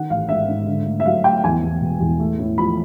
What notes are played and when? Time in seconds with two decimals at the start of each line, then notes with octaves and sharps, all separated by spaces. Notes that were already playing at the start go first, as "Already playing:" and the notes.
Already playing: D#3 F#5
0.10 A1 F5
0.29 G#2 E5
0.48 G#2
0.67 D3
0.86 A3
1.00 E5
1.05 F#3 F5
1.24 A3 G5
1.44 E2 G#5
1.62 E2
1.82 E1
2.00 E2
2.20 A3
2.39 A2
2.58 F3 B5